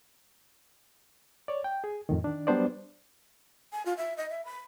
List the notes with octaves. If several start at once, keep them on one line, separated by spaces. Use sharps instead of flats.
C#5 D5
G5
G#4
F2 A2 D#3
D#3 D4
F#3 G3 B3 D4 C5 D5
G#5
F4
E5
D#5
E5
B5